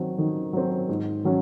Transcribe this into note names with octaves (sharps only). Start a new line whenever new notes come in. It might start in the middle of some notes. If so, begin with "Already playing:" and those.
Already playing: D#3 F#3 C4
D#3
F#3 C4
G#2
D#3 F#3 C#4